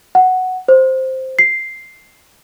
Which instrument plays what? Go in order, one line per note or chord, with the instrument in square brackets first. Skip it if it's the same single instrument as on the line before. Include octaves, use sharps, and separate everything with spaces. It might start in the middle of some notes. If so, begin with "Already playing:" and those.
[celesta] F#5
C5
C7